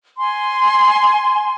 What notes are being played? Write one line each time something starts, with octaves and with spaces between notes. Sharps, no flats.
G#5 C6